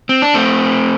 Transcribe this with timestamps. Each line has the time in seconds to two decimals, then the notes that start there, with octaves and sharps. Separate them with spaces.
0.09 C4
0.22 D4
0.34 A3 C4